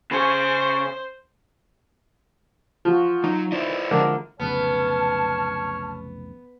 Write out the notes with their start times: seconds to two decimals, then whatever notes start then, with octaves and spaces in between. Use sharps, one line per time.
0.11 C#3 G#4 C5
2.85 F3 F4 F#4
3.24 F#3 D#4
3.52 E4 C5 D5 D#5
3.91 D3 F3 G#3 A#4
4.40 F1 B1 C#3 B3 C#5 A5 F6